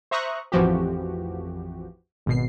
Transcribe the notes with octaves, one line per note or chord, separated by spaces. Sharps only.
C5 E5 A#5 C#6 D#6 F#6
A1 F2 E3 F3 F#4 G4
G#1 B2 C7